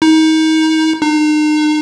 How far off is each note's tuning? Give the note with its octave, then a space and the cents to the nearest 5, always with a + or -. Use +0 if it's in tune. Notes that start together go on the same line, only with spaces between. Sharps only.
D#4 +30
D#4 -40